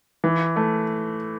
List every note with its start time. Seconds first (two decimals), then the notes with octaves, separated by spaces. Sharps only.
0.24 E3
0.56 A3